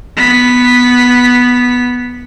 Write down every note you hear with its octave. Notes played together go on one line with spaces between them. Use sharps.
B3 B6